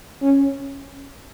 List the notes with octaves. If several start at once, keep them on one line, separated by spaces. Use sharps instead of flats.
C#4